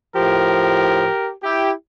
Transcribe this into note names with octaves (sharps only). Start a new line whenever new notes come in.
A2 F3 G4 A#4
E4 G4